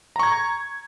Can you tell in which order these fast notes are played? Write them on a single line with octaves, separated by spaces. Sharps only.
A#5 C#6 G#6